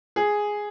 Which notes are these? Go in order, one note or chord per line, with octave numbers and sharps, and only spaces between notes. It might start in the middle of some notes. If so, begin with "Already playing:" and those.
G#4